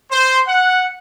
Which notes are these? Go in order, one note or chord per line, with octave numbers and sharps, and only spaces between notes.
C5
F#5